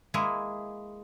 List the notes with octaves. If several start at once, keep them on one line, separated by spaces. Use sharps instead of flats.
G#3 A#3 E4 G#4